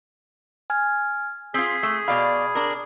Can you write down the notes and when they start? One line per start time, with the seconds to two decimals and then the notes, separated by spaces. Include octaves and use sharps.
0.70 G#5 F6 G#6
1.54 C4 F4 G#4 B6
1.83 A3
2.08 B2 D5 F5 B5
2.55 D4 A#4